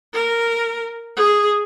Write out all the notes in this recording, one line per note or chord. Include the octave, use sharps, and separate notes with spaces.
A#4
G#4